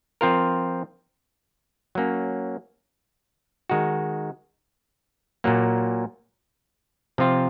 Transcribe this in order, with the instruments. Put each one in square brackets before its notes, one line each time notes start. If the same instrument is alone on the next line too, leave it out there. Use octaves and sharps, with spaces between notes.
[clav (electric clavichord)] F3 C4 F4 A#4
F#3 A#3 C#4
D#3 G#3 D#4 F#4
A#2 F#3 A#3
C3 F3 C4 F4